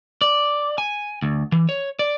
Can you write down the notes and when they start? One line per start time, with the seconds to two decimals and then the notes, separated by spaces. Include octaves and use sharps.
0.21 D5
0.78 G#5
1.22 D2
1.52 E3
1.69 C#5
1.99 D5